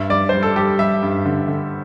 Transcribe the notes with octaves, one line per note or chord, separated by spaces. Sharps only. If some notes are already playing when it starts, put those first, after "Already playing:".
Already playing: G2 E5
G3 D5
G3 C5
A4
G3 G4
G3 E5
G2
D3
D3